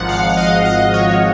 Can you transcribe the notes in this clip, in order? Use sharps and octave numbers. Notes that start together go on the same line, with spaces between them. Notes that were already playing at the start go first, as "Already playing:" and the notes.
Already playing: G#1 G#2 F3 F#5
F5
F5
D#5
D#5
C#5